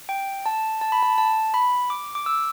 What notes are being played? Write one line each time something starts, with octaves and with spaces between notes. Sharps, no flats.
G5
A5
A5
B5
A5
A5
B5
D6
D6
E6